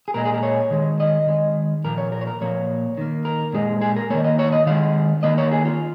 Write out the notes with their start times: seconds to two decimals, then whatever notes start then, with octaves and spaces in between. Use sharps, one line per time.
0.08 G#4
0.14 A#2 G#3 A#4
0.25 G#4
0.34 A#4
0.43 C#5
0.71 D#3 G#3
1.00 D#5
1.27 D#3 G#3
1.85 A#2 F3 A#3 A#4
1.98 C#5
2.12 A#4
2.21 C#5
2.27 A#4
2.41 A#2 F3 A#3 C#5
2.97 D#3 A#3
3.25 A#4
3.53 A#2 G#3 G#4
3.81 G#4
3.96 A#4
4.10 D#3 A#3 C#5
4.24 D#5
4.39 C#5
4.52 D#5
4.66 D#3 G#3 F5
5.23 D#3 A#3 D#5
5.38 C#5
5.52 G#4
5.65 F4